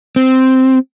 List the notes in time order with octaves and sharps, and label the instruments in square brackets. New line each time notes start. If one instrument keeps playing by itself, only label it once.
[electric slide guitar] C4